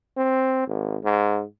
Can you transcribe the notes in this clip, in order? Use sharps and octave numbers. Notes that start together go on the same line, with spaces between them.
C4
G#1
G#2